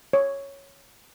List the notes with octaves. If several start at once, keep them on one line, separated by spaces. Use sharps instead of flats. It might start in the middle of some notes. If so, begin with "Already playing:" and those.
C#5